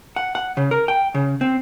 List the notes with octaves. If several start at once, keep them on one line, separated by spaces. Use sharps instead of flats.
F#5
F#5
C#3
A#4
G5
C#3
C4